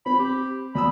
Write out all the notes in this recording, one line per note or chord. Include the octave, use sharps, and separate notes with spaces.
C4 B5
G4
D2 B5 D#6 E6